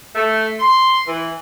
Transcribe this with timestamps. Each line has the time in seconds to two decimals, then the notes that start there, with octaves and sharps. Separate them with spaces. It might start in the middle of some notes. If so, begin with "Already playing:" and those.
0.15 A3
0.59 C6
1.07 E3